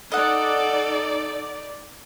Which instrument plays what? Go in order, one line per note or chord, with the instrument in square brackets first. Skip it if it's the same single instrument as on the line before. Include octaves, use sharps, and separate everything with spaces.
[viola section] D#4 D5 [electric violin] A4 [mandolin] D#5 F#5